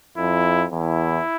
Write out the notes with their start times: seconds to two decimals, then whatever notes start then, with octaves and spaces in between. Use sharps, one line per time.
0.17 F2 E4
0.72 E2 E4